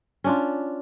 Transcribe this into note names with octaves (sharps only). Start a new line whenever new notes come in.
C#4 D4 F4